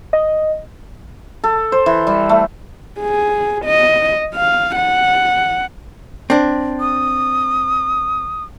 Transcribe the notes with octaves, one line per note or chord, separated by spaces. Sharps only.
D#5
A4
C5
E3
G3
A3
G#4
D#5
F5
F#5
C4 D4
D#6